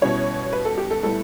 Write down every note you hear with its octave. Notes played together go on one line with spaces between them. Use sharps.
B2 G3 C#4 E4 C#5
B4
A4
G4
A4
A2 G3 B3 E4 A4